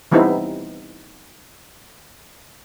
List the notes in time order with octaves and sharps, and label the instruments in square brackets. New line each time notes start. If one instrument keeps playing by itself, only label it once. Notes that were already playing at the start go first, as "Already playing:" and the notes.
[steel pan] E3 G3 B3 C4 D#4 E4